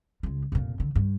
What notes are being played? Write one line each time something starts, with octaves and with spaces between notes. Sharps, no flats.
C#2 G#3
F1 A#2
D3
G2